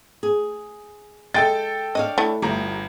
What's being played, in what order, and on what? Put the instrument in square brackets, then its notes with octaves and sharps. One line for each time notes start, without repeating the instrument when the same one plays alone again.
[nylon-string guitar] G#4
[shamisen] G#3 [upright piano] A4 G5 A6
[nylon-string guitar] D4 C#5 F5 [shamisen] D#5
[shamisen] A3 E4
[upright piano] G1 A#5 [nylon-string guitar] D2 G4